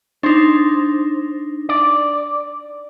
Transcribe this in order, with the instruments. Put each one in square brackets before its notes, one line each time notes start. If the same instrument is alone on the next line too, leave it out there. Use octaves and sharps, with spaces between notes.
[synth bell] D4 D#4 [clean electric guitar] C5
[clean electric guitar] D5